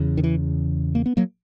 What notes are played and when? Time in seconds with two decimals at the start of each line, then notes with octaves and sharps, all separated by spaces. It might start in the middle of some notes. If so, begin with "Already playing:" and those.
Already playing: E2 C#3
0.17 D#3
0.24 E3
0.95 A#3
1.06 B3
1.17 F#3 A#3